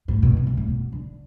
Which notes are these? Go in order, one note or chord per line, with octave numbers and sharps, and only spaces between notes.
A2
B2
C3
B2
A2
B2
D3